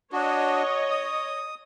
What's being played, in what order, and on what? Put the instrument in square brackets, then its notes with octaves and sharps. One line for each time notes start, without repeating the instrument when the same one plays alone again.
[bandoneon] D4 F#4 [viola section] C#5 D#5
[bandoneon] D#6